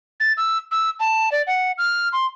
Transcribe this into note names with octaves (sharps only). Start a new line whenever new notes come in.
A6
E6
E6
A5
D5
F#5
F6
C6